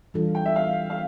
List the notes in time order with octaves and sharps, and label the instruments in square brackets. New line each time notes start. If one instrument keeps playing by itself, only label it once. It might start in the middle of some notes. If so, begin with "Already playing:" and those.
[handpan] E3 G3 D4 F4 A4
[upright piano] G5
E5
F5
F5